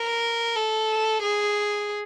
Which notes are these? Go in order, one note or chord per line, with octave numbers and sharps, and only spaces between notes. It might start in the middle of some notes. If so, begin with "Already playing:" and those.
Already playing: A#4
A4
G#4